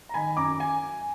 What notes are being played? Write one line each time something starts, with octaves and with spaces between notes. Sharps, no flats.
A#5
D#3 G#5 B5
F#2 A#5 D6
G#5